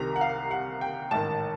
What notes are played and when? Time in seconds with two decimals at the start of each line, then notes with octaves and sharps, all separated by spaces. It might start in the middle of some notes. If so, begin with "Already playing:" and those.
Already playing: C2 C3 D#3 A#5
0.16 F#5
0.21 F5
0.51 F#5
0.81 G5
1.11 A1 G#2 D#3 A5